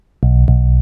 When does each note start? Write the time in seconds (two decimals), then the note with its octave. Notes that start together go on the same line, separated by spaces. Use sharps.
0.23 B1
0.48 B1